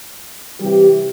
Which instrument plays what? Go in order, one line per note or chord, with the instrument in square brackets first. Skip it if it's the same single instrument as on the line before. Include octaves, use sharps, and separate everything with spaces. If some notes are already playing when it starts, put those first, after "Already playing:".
[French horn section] C3 E3 G3 G4